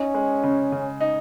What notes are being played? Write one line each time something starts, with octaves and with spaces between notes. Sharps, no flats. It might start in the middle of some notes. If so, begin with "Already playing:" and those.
Already playing: C#4 D#4
G#3
C#3
C#3
D#4